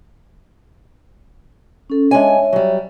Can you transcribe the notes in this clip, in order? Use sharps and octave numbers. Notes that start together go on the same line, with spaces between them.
C#4 A4
G#3 D4 C#5 E5 G#5
F#3 G3